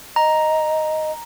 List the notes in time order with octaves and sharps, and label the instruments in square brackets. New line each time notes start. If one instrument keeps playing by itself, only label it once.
[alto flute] D#5 [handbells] A#5